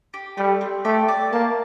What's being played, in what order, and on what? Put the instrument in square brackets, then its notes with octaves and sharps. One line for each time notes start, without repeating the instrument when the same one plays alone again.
[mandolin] G4
[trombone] G3 [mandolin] A3
[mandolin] C4
[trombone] A3 [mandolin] G4
[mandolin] D5
[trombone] A#3 [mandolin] A5